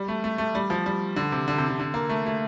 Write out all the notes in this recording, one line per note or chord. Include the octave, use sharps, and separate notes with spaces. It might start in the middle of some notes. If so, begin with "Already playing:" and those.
Already playing: G3
A3
A3
A3
G3
F3
G3
D3
C3
D3
C3
D3
D3
A#3
A3
A3